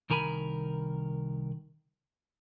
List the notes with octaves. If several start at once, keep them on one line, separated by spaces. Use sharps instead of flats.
C2 D#3 A#4 G#5 B5